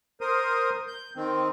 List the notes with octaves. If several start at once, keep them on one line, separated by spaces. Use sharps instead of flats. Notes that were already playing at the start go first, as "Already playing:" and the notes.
A#4 C5 D#6
G6
D#3 C4